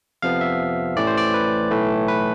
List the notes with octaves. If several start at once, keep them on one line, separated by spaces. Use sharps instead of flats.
F2 C3 F3 B3 F5
E5
A1 A2 E3 A3 D5
C5
D5
B4
B1 A2 E3 A3
B4